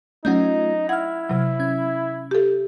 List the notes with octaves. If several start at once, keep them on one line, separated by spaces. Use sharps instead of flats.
F#3 A3 C#4 D#4 F4 D#5 G6
E4 F#5 F6 G#6
C3 F#3
C#4 G#6
G4 A4